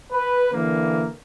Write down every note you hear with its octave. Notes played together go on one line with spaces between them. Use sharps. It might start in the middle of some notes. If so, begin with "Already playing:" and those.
B4
D3 E3 A#3